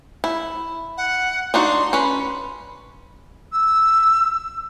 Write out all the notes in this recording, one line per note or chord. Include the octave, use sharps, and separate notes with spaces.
E4
F#5
D4 D#4 F#4 C6
C#4 B4
E6